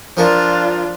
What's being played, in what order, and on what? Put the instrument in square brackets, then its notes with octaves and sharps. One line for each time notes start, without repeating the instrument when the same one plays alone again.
[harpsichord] F3 A#4 [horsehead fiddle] D4 F4